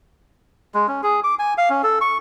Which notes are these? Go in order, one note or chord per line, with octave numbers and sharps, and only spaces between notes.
G#3
C#4
G#4
D6
G#5
F5
C#4
A4
C#6